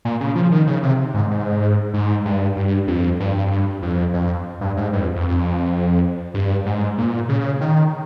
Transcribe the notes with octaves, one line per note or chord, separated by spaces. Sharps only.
A#2
C#3
F3
D#3
C#3
C3
G#2
G#2
G#2
G2
G2
F2
G2
F2
F2
G2
G#2
G2
F2
F2
G2
G#2
A#2
C#3
D#3